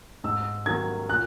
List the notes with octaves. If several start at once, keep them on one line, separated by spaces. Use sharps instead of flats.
G#2 E6
D#3 F#3 A#3 G#6
A#2 F#6